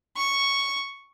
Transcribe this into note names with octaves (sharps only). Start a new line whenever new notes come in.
C#6